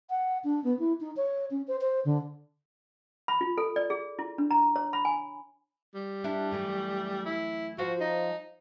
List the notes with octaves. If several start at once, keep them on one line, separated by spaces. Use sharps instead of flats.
F#5
D4
B3
E4
D#4
C#5
C#4
C5
C5
D3
B5
F4
A4
D5
G#4
E4
D4
A#5
C#5
B5
G#5
G3
D4 E4
F#2 E3 A3
E4
F3 F4 F#4 C5
D#4